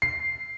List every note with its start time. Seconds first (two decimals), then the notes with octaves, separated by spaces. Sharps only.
0.02 C7